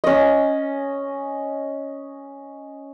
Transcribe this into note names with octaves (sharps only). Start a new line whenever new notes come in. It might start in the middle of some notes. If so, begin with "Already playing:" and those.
C#4 D#5